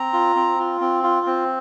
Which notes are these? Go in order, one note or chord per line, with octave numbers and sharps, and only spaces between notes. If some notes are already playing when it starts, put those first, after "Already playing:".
Already playing: C4 A#5
F4
C4
F4
C4
F4
C4